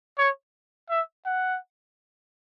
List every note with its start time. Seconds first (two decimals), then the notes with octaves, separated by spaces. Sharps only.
0.18 C#5
0.90 E5
1.25 F#5